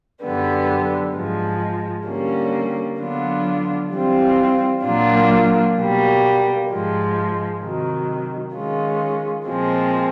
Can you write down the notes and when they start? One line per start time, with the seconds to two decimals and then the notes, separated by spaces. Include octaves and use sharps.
0.21 F#2 D3 G3 B3
1.14 G#2 F3 G#3
2.06 D3 G3 A#3 C#4
2.99 D3 F#3 B3 D4 F4
3.92 E3 G3 C4 F4
4.83 A#2 F#3 A#3 D4 F4
5.76 B2 G3 A#3
6.69 G#2 F3 G#3
7.62 C3 D#3 F#3
8.53 D#3 G#3 C#4 F4
9.46 A#2 F3 G#3 C4